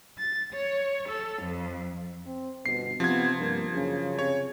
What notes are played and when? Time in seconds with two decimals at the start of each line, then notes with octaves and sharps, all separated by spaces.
0.19 A6
0.54 C#5
1.09 A4
1.44 F2
2.26 C4
2.66 G1 B2 C7
3.00 C3 F3 B3 G#6
3.40 G2 A#3
3.74 F#2 C#3
4.19 C3 C#5